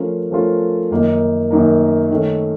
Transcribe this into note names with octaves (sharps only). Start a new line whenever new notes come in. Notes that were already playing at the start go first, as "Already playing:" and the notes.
Already playing: F3 A3 C#4 F4 A#4
F3 A3 C#4 F4 A#4
F#2 D#3 A#3 D#4 A#4
F#2 D#3 A#3 D#4 A#4
D#3 A3 C#4